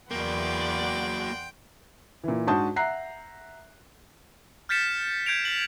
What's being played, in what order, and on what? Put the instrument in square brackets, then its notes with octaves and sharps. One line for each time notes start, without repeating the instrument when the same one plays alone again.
[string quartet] E2 B3 D5 [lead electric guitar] F#3 A#3 [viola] F#5 C6 [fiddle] G5
[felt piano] A#2 E3
G#2 D4 F#4 A5 D#6 G6
E5 F#5 A#5 F#6 C7
[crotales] F6 G6 A6 B6 C#7 E7
G6 G#6 C7 D7 F7
B6 F#7